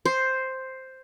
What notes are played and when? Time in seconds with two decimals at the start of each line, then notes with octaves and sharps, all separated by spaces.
0.05 C5